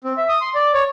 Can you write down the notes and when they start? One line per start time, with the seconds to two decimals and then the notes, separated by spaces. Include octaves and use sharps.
0.04 C4
0.17 E5
0.29 D#6
0.41 C6
0.55 D5
0.74 C#5